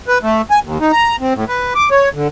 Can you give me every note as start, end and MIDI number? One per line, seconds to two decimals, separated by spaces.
0.08 0.18 71
0.23 0.42 57
0.51 0.59 80
0.64 0.78 39
0.81 0.92 63
0.92 1.16 82
1.20 1.33 60
1.35 1.45 45
1.48 1.73 71
1.75 1.89 86
1.91 2.09 73
2.14 2.28 50